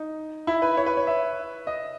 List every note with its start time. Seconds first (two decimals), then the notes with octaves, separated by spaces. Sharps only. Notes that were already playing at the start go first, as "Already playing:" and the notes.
Already playing: D#4
0.47 E4
0.62 B4
0.77 C#5
0.86 B4
0.97 C#5
1.07 E5
1.67 D#5